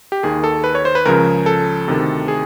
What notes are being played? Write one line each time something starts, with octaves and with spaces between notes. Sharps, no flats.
G4
D#2 D#3 G#4
A4
B4
C#5
C5
B4
C#2 C#3 F3 A#4
A4
D2 C3 D#3
G#4